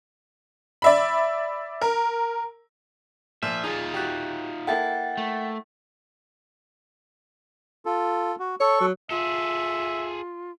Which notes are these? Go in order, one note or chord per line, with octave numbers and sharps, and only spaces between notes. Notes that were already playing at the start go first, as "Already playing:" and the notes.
D5 E5 B5
A#4
A#2 F3 E5
D#4 F4 G#4
F#4 G4
A#3 E4 A4 F#5 G5 A6
A3
F4 A4
F#4
A4 C#5 C#6
F#3
F4 G#4 A4 E5